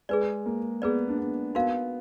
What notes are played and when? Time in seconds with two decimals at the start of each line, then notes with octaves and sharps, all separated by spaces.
0.09 G#3 G#4 B4 D5
0.46 A#3
0.82 B3 G#4 B4 D5
1.08 D4
1.18 B3
1.55 B3 D#4 F#4 A#4 F5